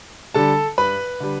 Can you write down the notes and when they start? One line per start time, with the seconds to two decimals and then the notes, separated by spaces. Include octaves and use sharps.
0.34 D3 G3 A4 A5
0.78 G2 B4 B5
1.20 D3 G3